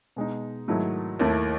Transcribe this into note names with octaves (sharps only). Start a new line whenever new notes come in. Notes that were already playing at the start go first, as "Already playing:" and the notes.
B2 G#3 D#4
G#2 D#3 F#3 A3 E4
D#2 D#3 A3 E4